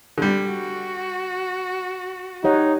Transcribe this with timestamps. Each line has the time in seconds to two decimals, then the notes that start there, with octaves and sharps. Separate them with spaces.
0.18 D3 G3
0.48 F#4
2.44 D#4 G4 C#5 F#5